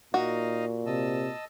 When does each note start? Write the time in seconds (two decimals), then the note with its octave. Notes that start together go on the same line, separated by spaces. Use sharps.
0.14 A#2 D#4 F#4 D#5 F5
0.86 C3 D#5 A5 E6